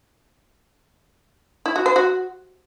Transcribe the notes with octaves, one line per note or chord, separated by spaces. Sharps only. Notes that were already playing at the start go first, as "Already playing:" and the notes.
E4
F#4
C5
F#4